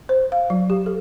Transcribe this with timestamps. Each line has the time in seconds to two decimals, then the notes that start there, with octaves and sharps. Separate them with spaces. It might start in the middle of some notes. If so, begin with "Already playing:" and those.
0.09 C5
0.32 F5
0.50 F#3
0.70 G4
0.86 A4